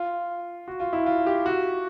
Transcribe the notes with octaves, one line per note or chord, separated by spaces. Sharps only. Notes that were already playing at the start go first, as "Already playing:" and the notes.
Already playing: F4
F#4
F4
E4
F4
G4
F#4